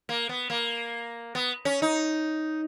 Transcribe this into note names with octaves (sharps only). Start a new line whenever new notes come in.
A#3
B3
A#3
B3
C#4
D#4